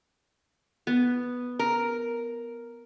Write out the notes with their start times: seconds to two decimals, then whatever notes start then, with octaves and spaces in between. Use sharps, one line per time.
0.87 B3
1.59 A#4